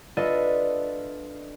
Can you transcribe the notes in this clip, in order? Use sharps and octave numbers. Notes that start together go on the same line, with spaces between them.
D4 F4 A4 B4 D#5 E5